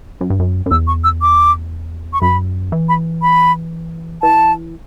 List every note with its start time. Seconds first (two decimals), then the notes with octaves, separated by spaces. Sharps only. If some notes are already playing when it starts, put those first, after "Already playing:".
0.21 F#2
0.30 G2
0.39 F#2
0.66 F#2
0.71 E2 E6
0.87 C#6
1.04 E6
1.22 D6
2.13 C#6
2.22 F#2 B5
2.72 E3
2.89 B5
3.22 B5
4.22 E3 A5